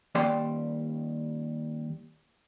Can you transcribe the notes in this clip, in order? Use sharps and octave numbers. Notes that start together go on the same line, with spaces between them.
D#2 G3 B4 C5 D5 G5